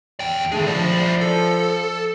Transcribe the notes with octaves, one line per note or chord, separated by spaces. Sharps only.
E2 G5
D#3 A3 D4 G#4
F3 E4 D5
A4